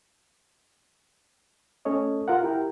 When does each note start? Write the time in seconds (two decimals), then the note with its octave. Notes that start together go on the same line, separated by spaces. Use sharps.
1.85 A3 C#4 A4 C#5 D#5
2.28 F4 A#4 F#5
2.42 E4 G4 A#4 G5